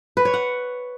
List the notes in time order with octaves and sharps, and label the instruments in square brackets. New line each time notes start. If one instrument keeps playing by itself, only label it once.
[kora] B4
C#5
F#5